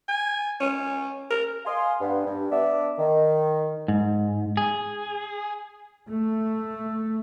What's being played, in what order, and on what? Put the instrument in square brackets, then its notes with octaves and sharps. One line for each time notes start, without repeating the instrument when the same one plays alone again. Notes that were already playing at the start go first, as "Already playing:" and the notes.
[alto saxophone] G#5
C#4
A#4
[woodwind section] F5 G#5 C6 D#6
G2 B3
G2
B3 D4 D5 E5
D#3
[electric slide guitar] G#2
G#4
[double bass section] A3